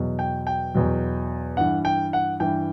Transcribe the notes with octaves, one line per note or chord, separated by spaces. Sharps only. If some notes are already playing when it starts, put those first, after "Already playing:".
Already playing: E2 B2 F#3
G5
G5
E2 B2 F#3
G2 E3 F#5
G5
F#5
G2 E3 G5